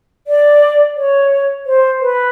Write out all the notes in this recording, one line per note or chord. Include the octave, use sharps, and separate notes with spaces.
D5
C#5
C5
B4